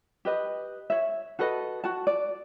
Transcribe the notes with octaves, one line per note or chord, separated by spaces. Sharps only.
G4 B4 D#5
C#5 E5
F#4 A4 B4 D#5
F#4 A5
D5